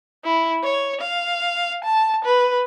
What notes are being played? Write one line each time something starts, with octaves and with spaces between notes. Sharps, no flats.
E4
C#5
F5
A5
B4